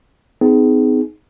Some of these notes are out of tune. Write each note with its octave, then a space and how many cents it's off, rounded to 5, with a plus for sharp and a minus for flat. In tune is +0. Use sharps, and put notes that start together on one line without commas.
C4 -45 D#4 +0 G#4 +10